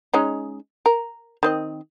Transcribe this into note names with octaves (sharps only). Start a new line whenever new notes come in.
G#3 C#4 D#4
A#4
D#3 C4 D#5